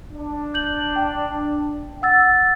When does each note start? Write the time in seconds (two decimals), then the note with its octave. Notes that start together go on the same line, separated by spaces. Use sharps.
0.13 D4
0.54 G6 F#7
0.96 G5
2.02 F#5 E6 A6